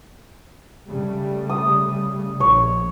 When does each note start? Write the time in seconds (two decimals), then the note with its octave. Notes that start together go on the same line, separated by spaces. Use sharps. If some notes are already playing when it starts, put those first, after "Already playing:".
0.88 C#3 G3 A3
1.50 D#6
2.40 A#1 C#5